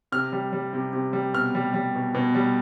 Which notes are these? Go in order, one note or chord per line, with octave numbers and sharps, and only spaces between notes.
C3 F6
G3
G3
C3
C3
G3
B2 F6
G3
G3
B2
B2
G3